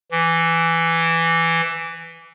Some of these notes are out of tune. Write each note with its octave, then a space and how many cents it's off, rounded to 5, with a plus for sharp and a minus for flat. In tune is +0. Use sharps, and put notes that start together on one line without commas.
E3 +10